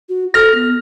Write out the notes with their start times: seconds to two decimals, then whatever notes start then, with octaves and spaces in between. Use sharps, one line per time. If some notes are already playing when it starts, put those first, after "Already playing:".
0.09 F#4
0.34 A4 F6 A#6
0.55 B3